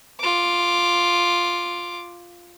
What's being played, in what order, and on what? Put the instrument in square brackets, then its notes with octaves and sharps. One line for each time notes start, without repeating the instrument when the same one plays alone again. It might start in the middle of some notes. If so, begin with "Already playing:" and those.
[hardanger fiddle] F4 D6